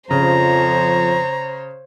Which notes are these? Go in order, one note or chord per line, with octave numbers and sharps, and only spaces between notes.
F2 C#3 F3 C5 C#5 A#5